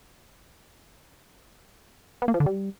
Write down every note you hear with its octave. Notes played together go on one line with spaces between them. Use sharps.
B3
A#3
F3
D3
G3